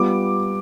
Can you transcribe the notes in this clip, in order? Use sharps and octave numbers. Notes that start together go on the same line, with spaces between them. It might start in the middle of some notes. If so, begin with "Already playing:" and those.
Already playing: G3 B3 F4 D6